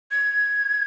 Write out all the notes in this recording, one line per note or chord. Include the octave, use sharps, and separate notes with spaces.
G#6